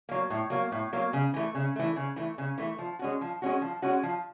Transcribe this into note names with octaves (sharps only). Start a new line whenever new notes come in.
F#3 A#3
A2
F#3 A#3
A2
F#3 A#3
C#3
E3 A3
C#3
E3 A3
C#3
E3 A3
C#3
E3 A3
F3
G#3 C#4 F#4
F3
G#3 C#4 F#4
F3
G#3 C#4 F#4
F3